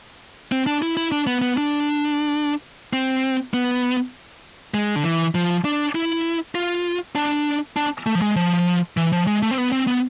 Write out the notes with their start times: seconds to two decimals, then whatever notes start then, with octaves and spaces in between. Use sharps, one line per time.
0.52 C4
0.66 D4
0.82 E4
0.97 E4
1.12 D4
1.27 B3
1.42 B3
1.57 D4
2.93 C4
3.54 B3
4.74 G#3
4.96 D3
5.05 E3
5.35 F3
5.65 D4
5.95 E4
6.55 F4
7.15 D4
7.77 D4
8.06 A3
8.15 F3
8.22 G#3
8.36 F3
8.97 E3
9.12 F3
9.27 G#3
9.42 A3
9.51 C4
9.58 B3
9.72 C4
9.87 B3